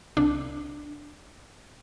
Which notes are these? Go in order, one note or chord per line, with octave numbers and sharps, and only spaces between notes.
C2 D4